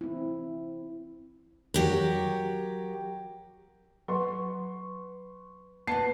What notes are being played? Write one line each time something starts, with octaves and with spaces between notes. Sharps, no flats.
C4 E4
F#3 G4 A#4
F#3 B4 C6 C#6
F#3 B3 A5 C7